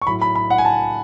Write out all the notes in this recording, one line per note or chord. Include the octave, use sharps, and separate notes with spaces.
C#6
A2 F#3 B5
B5
B5
F#5
G#5
A5